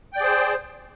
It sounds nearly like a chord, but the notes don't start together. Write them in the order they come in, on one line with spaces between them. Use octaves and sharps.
G5 D5 G#4 C5